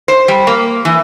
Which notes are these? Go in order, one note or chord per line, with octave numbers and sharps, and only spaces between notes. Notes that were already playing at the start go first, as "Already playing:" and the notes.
C5
G3
A#3
E3